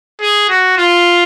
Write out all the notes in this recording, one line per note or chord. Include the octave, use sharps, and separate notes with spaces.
G#4
F#4
F4